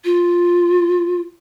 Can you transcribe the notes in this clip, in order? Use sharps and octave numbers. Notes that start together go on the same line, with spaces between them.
F4